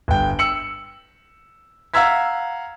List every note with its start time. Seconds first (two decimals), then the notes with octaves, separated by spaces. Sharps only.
0.08 G1 G5
0.39 E6 C#7 F#7
1.94 F5 F#5 A#5 E6 G#6 B6